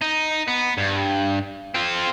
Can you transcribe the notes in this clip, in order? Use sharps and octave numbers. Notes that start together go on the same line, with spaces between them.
D#4
B3
G2
C4 F4